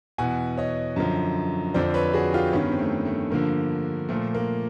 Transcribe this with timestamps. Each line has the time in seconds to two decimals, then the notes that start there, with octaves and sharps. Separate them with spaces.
0.18 E2 B2 F#5 G#5
0.57 C#5 D#5
0.96 F#2 D3 F3
1.74 F2 D3 F3 C5 D5
1.94 B4 C#5
2.14 F#4 G#4
2.33 F4 G4
2.53 G2 D#3 B3 C#4
2.72 C4
2.79 A3 B3
3.05 A3
3.31 G2 D3 F3 A#3
4.09 A#2 F3 A3
4.35 A#3